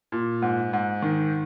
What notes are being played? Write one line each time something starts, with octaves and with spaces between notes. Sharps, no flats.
A#2
G#2
G#2
D#3